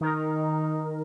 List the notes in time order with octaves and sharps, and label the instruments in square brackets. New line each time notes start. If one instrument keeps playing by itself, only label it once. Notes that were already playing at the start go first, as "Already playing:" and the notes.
[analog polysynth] D#3 A#4 [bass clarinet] D#4